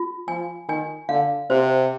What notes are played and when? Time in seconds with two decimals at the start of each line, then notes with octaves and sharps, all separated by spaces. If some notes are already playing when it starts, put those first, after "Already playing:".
Already playing: F4
0.28 F3 G#5
0.69 D#3 G#5
1.09 D3 F5
1.50 C3 C5